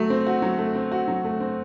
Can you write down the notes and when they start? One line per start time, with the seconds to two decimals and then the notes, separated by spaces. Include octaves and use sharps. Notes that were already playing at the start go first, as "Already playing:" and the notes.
Already playing: F#3 A3
0.10 C4
0.27 F#4
0.42 F#3
0.58 A3
0.75 C4
0.92 F#4
1.08 F#3
1.24 A3
1.40 C4